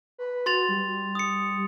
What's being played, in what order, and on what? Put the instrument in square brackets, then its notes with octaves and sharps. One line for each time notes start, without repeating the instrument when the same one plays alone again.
[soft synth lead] B4
[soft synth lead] F#4 [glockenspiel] C6 A6 F7
[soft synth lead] G3
[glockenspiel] D#6 C#7